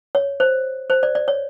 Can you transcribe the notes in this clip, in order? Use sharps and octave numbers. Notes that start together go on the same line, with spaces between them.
C#5
C5
C5
D5
D5
C#5